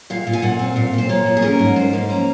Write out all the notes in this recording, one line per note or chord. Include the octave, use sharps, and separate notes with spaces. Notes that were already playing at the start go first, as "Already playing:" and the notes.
A#2 F5
A#2
G#5
A#2 F#5
C4
A#2 F5
A#2 C5
A#3 C#5
F3
G#4
C#4 A#4
G#2
F3 C5
A#3
C#4 A#5